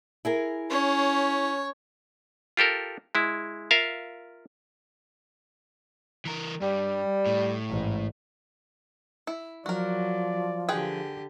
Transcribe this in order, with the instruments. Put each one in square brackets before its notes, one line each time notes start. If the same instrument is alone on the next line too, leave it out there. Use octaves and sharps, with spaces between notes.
[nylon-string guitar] E4 G#4 A#4
[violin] C#4 [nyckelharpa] C#5
[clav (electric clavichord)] F4 G4 A4 A#4
G#3 E4
F4 A#4 E5 F5
[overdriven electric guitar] E3 A#4
[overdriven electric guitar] G2 [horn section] G3
[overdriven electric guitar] A2
[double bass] A1 G#2
[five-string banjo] E4
[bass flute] F3 [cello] F#3 [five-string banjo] F#4 A#4 [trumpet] D5
[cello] D3 G4 [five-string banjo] G#4 B4 G5